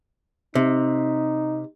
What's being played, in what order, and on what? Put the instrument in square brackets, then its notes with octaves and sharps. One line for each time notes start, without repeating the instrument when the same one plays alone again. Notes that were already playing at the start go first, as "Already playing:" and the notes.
[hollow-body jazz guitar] C3 [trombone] D#4